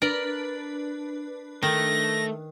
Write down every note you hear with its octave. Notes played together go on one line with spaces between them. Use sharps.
D4 A#4 B4
D#3 A3 A#6